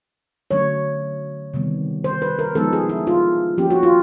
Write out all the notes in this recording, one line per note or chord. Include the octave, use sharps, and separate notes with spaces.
D3 F#3 A3 C#4 C#5
C3 D#3 G3 B3
C5
B4
A#4
F3 G#3 B3 D#4 A4
G#4
E4
F4
F3 A#3 C#4 G4
F#4
F4